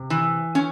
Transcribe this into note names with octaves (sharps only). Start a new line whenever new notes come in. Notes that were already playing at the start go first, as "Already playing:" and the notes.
Already playing: C3
E3
C#4